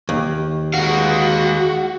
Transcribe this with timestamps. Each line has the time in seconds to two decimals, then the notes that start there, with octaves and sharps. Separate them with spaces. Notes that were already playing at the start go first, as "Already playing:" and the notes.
0.09 D#2
0.74 G#3 F#4 F5